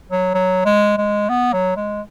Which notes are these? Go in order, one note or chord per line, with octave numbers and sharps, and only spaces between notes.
F#3
F#3
G#3
G#3
B3
F#3
G#3